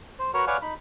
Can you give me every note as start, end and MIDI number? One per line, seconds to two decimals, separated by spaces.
0.19 0.31 72
0.34 0.45 66
0.34 0.45 70
0.34 0.45 71
0.34 0.45 73
0.34 0.45 78
0.47 0.57 71
0.47 0.57 73
0.47 0.57 74
0.47 0.57 77
0.47 0.57 78
0.47 0.57 80
0.62 0.74 63
0.62 0.74 83